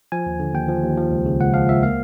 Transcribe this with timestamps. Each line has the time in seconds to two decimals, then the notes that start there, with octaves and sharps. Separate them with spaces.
0.12 F3 G#5
0.26 D#2
0.40 D3
0.54 D#2 G5
0.68 F3
0.83 D#2
0.98 F3
1.11 C#2
1.26 C#3
1.40 C#2 F#5
1.54 F3 F5
1.69 C#2 E5
1.83 A#3 F5